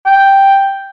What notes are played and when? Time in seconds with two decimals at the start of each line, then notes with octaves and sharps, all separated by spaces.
0.06 G5